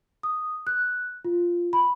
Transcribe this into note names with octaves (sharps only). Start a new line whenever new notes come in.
D#6
F#6
F4
B5